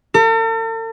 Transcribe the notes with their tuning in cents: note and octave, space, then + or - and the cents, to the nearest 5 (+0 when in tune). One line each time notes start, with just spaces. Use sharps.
A4 +45